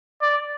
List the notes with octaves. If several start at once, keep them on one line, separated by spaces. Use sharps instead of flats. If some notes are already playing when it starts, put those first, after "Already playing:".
D5